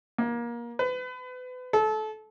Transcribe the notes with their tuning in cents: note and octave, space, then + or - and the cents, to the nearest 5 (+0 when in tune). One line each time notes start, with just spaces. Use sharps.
A#3 +25
B4 +35
A4 -25